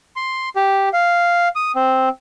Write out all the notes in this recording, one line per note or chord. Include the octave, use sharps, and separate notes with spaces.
C6
G4
F5
D#6
C4